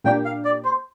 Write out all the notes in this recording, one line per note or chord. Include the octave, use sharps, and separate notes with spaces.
A#2 A#3 D4 G4 G5
F5
D5
C5